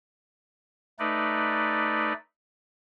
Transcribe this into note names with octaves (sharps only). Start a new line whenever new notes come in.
A3 D#4 B4 D5